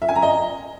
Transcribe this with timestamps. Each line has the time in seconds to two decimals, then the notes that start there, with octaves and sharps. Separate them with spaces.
0.02 E5
0.09 G#5
0.15 A#5
0.22 D#5